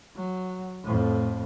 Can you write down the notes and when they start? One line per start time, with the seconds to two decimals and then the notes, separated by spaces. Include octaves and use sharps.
0.16 F#3
0.83 F2 A2